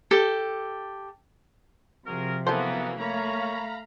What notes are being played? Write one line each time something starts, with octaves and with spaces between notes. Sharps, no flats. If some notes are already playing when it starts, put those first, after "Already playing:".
G4 A4
C3 F3 F#4 G#4 A#4
E3 F#3 A#3 B3 A4 A#4 C5
A3 A#3 C#5 F5 A#5 B5